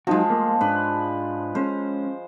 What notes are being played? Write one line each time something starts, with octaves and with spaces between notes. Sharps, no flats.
F3 F#3 G#3 D#4 F#4
A3 A#3
G#2 D4 B4
G#3 C#4 C5